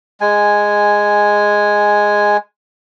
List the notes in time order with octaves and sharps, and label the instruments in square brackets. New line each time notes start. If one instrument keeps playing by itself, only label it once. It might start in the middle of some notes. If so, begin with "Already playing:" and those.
[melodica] G#3 G#5